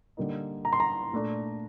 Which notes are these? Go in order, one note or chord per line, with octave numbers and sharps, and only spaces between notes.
D3 G3 A#3 D#4
A#5
C6
A#5
A#2 A3 D4